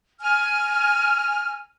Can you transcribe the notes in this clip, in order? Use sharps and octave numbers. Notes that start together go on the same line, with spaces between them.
G#5 F6